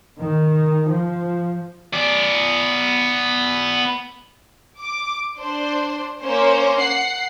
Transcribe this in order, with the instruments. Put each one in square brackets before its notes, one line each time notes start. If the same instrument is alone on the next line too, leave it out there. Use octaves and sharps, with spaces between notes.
[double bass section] D#3
F3
[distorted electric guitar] B3 D5
[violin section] D6
D4 C5
A#3 C#4 C5
F#5 C7